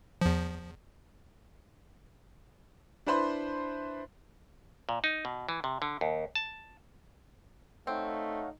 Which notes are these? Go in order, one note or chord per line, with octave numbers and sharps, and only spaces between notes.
E2 F3
D4 E4 B4 C5 B5 C6
A#2
D#4
B2
E3
C3
D3
D#2
A5
A3 C4 D#4 C#5 F5 F#5